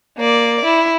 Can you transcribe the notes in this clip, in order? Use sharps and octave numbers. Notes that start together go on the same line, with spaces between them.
A#3 D5
E4